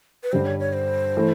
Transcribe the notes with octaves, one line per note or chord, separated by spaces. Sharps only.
B4
G2 D3 G3 C5
C#5
C#5
C5
E3 A3